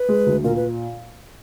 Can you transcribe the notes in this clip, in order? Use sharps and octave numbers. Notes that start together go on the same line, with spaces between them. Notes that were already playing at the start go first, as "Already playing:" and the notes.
Already playing: B4
G#3
D2
A#2 A#4
B4